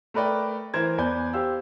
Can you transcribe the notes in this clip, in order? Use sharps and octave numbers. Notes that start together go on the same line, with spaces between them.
A3 A#4 B4 D5 G5
E3 A#4 C5 G#6
E2 B4 D5 G#5 G6
G4 C5 F5 E6